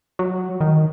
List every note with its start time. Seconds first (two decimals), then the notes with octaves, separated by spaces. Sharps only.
0.19 F#3
0.61 D#3